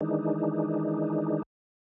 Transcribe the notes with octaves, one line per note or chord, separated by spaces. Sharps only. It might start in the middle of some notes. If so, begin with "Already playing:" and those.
D#3 E3 G#3 D4 D#4